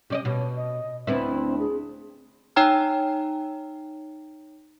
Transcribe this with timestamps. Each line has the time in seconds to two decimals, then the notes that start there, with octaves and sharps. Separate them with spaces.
0.10 C3 C#4 D5 D#5
0.25 B2 C#5
0.56 D#5
1.07 D2 B3 C4 E4
1.59 G#4
2.56 D#4 C#5 G5 A#5 F6